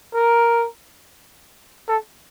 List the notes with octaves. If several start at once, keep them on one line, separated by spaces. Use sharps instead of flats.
A#4
A4